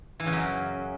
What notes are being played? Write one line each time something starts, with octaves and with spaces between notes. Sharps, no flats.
E3
C#3
F#2